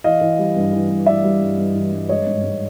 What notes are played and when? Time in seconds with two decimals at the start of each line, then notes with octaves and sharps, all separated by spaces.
0.04 E3 D#5 F5
0.21 E3
0.39 G3
0.56 G2
0.73 E3
0.89 G2
1.06 E3 D5 E5
1.24 G3
1.41 G2
1.58 G2
1.75 E3
1.92 G2
2.09 G#3 C#5 D#5
2.27 G#2
2.44 G#2